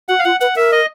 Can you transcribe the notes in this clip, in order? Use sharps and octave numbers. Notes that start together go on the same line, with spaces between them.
F#4 F#5
F5
F4 F#5
B4 F#5
A#4 E5
D#5